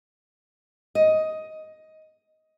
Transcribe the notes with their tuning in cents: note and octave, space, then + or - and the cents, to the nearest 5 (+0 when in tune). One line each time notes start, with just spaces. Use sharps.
D#5 +10